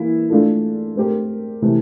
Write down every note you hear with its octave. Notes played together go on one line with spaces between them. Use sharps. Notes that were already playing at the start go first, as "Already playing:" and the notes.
Already playing: E3 A#3 E4
A3 D4 F4 A4
A3 C4 G4 A#4
C3 E3 A3